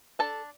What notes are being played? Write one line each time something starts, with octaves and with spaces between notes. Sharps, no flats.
D4 A4 A5